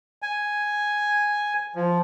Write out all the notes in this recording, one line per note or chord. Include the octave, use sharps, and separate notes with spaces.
G#5
F3